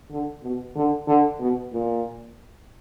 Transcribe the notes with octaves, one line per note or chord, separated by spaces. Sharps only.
D3
B2
D3
D3
B2
A#2